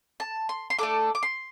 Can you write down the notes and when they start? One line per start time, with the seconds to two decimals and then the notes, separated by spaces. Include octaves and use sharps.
0.20 A5
0.49 C6
0.70 C6
0.79 A3 D4 A4 D6
1.15 D6
1.23 C6